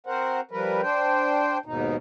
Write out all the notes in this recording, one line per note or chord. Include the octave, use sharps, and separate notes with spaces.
C4 F#4 A#4 C5 F#5
F3 G3 A#4 B4
D4 C5 G5
D#2 G#2 B2 D#4